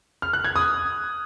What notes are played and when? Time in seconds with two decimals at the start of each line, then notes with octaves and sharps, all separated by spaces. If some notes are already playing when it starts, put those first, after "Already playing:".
0.22 F6
0.33 F#6
0.44 G#6
0.56 D#6